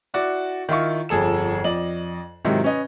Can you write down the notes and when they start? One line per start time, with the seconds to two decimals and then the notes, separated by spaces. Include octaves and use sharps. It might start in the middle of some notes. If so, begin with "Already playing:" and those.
0.14 E4 F#4 D5
0.69 D#3 E4 F4 C#6
1.09 G1 F2 G#4 A4 E7
1.64 F2 D5 D#5 F#7
2.45 G#2 C3 D#3 F#3 D#4 E4
2.64 C#4 B4 D#5